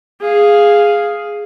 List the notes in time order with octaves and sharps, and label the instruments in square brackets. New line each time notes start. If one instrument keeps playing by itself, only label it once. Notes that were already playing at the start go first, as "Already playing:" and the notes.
[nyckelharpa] G#4 F5